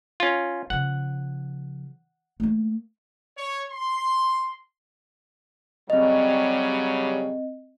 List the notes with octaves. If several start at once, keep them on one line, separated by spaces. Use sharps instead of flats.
C#4 F4
C#3 F3 F#5
A3 A#3
C#5
C6
C#3 F#3 G3 C4 D#5